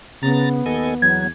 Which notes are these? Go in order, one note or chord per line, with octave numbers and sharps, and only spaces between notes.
C#3 B3 A#5 A6
D#2 A4 D#5 G#5
E2 F#3 G#6